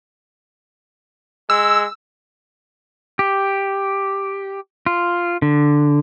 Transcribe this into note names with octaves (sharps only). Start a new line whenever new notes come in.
G#3 E6
G4
F4
D3